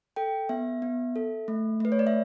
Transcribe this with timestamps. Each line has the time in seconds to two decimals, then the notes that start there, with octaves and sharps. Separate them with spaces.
0.16 A4 G5
0.49 B3 E5
0.82 B3
1.16 A4
1.48 A3
1.80 A3 B4
1.92 C#5
1.99 D5
2.07 E5